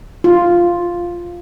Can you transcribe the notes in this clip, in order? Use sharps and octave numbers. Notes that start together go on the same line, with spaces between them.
F4